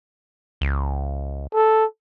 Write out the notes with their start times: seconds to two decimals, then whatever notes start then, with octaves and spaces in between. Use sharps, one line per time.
0.61 C#2
1.53 A4